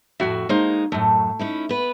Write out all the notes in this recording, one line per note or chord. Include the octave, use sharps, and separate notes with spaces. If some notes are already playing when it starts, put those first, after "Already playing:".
F2 A2 F#4 E5
G#3 A#3 D#4 C5
F#2 A2 A3
C#4 D#4 E4
B3 B4